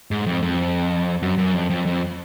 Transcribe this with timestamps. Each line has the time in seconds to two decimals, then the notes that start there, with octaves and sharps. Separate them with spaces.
0.11 G#2
0.26 F2
0.42 F2
1.22 F#2
1.38 F#2
1.54 F2
1.70 F2
1.86 F2